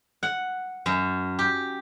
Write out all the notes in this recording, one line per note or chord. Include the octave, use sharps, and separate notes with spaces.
F#5
F#2
G4